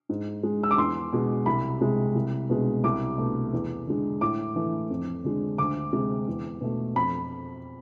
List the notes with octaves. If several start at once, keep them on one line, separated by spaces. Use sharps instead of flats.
G#2
G#3
E6
D6
E2 C6
B2 G#3
C2 B5
C3 G#3
C2
B2 G#3
C2 D6
B2 A3
E2
D3 G#3
A2 D6
E3 A3
F2
D3 G#3
D2 D6
C3 G#3
E2
B2 A3
F2 B5